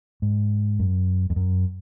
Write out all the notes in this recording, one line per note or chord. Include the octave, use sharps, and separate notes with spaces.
G#2
F#2
F2
F#2